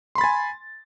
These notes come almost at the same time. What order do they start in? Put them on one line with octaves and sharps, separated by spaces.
C6 B5 A6 G#5